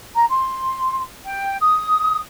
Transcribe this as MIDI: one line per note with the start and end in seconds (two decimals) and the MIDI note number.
0.16 0.24 82
0.29 1.00 84
1.24 1.55 79
1.61 2.19 87